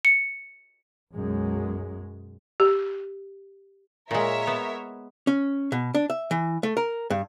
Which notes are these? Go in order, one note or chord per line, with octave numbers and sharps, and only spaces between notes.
C#7
B1 F#2 G#3
G4
A#2 G#3 A#4 C#5 E5
B3
C#4
B2
D4
E5
E3
A3
A#4
G2